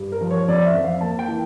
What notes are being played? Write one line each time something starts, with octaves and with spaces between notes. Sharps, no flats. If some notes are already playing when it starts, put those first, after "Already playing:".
Already playing: G2
A#4
F3
C#5
F2 D5
E5
F2
F5
A#3 A5
G5
E3